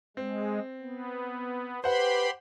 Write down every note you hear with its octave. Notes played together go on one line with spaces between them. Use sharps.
G#3 C4
B3
G4 B4 C5 F#5 B5 C6